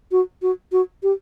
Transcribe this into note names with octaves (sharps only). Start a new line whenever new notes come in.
F#4
F#4
F#4
G4